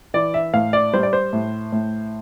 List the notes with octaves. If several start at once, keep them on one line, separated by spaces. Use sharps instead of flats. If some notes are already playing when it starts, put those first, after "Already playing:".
E3 D5
E5
A2 F5
D5
G3 C5
D5
C5
A2
A2